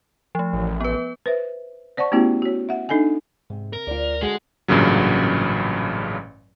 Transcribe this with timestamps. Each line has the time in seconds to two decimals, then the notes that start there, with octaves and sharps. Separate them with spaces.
0.35 F3 A3
0.53 A1
0.81 B3 B4
1.26 B4 C5 E5
1.97 C5 D5 F#5 A5 C#6
2.12 A3 B3 C#4 E4 F#4 G4
2.42 F#4 C#5
2.69 E5 F#5
2.89 D4 D#4 A4 D#5 G#5
3.50 G#2 C3
3.73 A#4
3.87 D2 F4 C5 D5
4.22 D3 G#3 F#4 G#4
4.68 A1 G2 A#2 C#3 F#3